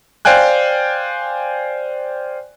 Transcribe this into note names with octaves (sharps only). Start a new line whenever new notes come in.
C5 D5 F5 G5 G#5 F#6